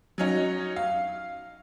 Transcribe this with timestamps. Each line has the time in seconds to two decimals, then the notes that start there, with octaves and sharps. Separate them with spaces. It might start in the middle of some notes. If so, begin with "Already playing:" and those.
0.18 F#3 C#4 D#4
0.76 F5